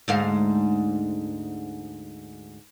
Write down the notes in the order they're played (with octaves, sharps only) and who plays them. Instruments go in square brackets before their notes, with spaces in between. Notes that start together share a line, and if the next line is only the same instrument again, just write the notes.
[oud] D2 G#2 F5